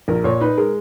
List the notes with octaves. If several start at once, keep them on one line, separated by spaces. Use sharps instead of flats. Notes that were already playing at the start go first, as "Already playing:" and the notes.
A#1 A#4
A#2 C#5
D#4 B4
G#3 A#4